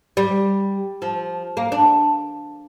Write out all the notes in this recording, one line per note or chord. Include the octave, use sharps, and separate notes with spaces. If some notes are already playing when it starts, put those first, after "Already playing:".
G3
F3
A#3
D4